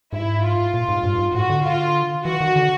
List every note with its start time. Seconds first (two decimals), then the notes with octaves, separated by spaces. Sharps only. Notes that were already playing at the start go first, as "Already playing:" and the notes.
0.13 G#2 E4
0.43 F4
0.74 A#2
0.88 G#2
1.03 G2
1.19 G#2
1.34 A2 F#4
1.50 D3
1.64 F4
2.25 E3 F#4
2.41 D#3
2.56 D3